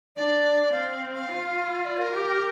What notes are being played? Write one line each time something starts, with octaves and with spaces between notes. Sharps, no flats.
D4 D5
C4 F5
F5
F4
D5
A#4
G4